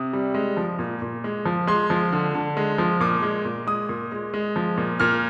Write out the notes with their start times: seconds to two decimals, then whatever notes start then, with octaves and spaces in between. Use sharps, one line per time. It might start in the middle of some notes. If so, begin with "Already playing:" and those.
Already playing: C3 D#6
0.13 G3
0.34 G#3
0.57 F3
0.79 A#2
1.02 A#2
1.24 G#3
1.46 F3
1.67 G#3 C6
1.90 F3
2.13 D3
2.35 D3
2.57 G#3
2.78 F3
3.00 A#2 D6
3.22 G#3
3.45 A#2
3.67 G#3 D#6
3.89 A#2
4.12 G#3
4.34 G#3
4.56 F3
4.78 A#2
5.00 A#2 F6